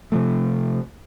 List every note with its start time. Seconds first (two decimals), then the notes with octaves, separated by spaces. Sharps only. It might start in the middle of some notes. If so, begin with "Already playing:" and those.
0.12 C3 F3 A3